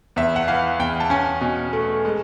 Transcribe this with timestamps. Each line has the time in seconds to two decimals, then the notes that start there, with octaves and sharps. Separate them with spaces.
0.16 E2 E5
0.36 F#5
0.48 E3 F5
0.80 E2 G5
1.00 A5
1.10 C#4 G#5
1.41 B2
1.73 A3
2.05 G#3